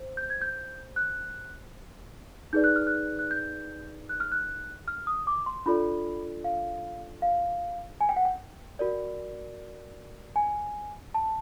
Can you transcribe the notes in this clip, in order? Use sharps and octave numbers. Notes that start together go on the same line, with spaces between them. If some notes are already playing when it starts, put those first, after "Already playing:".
Already playing: C5
G6
G#6
G6
F#6
D#4 G#4 B4 D5 G6
F#6
F6
F#6
F#6
G6
F#6
F6
F#6
F6
D#6
D6
C6
D4 F4 A4 D5 B5
F5
F5
G#5
G5
F#5
G5
F#4 A#4 D5
G#5
A5